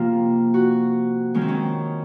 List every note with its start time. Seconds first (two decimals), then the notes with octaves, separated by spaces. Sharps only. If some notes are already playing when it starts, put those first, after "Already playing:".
Already playing: C3 F3 A#3 F4
0.54 F#4
1.34 D#3 G#3 C#4
1.41 C4
1.48 C#4